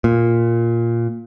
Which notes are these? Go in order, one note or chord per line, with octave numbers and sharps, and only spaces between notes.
A#2